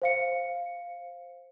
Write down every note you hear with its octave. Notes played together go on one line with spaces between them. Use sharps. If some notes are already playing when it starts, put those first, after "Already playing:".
C5 F5 C#7